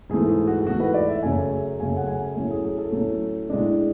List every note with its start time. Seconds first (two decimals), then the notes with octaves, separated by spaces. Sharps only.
0.09 G#2 E3 A3 G#4
0.29 G#4
0.47 F#4
0.66 G#2 E3 A3 F#4
0.80 B4
0.94 D5
1.09 E5
1.23 F#2 C#3 F#3 A3 C#4 G#5
1.80 F#2 C#3 F#3 A3 C#4 G#5
1.97 F#5
2.07 G#5
2.36 A2 F#3 A3 C#4
2.51 G#4
2.65 G#4
2.78 A4
2.92 A2 F#3 A3 C#4
3.49 A2 G#3 D4